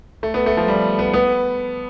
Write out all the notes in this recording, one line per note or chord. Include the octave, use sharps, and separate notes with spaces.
A3
B3
A3
F3
G3
B3
B3